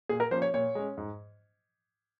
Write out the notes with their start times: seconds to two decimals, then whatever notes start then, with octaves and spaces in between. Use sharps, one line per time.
0.09 A#2 G#4
0.20 A#4
0.31 F3 A#3 C#4 C5
0.42 C#5
0.54 A#2 C#5
0.75 G#3 C#4
0.97 G#2